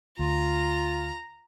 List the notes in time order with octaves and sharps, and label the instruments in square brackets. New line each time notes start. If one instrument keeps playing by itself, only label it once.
[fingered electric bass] D2 [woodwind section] F4 [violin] A#5